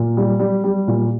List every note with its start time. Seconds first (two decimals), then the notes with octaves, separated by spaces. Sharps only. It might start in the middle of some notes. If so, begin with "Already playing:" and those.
Already playing: A#2
0.17 G3
0.39 G3
0.64 G3
0.88 A#2